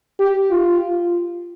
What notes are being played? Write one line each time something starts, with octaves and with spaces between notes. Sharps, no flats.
G4
F4